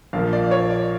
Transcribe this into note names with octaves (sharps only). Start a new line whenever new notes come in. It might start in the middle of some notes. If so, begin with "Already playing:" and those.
A#1 A#2 F3 A#3 F5
D5
C#5
D5